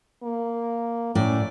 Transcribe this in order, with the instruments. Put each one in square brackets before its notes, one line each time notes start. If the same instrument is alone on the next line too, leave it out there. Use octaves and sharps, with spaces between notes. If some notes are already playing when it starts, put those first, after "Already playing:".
[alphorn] A#3
[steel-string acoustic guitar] A2 D5 [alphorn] C#4